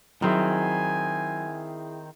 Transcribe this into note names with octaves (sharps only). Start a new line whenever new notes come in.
D#3 F#3 C4 E4 G#4 E5 G#5